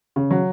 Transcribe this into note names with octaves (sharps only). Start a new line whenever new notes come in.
C#3
F#3